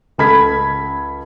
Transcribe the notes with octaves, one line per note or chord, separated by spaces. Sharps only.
C#2 A4 B5 G#6 B6